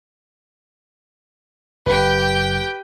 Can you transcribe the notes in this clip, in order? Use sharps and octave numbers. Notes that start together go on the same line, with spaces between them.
F#1 G4 B4 G5